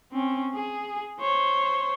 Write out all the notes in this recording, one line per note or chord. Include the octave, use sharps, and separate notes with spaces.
C4 C#4
G#4
C5 C#5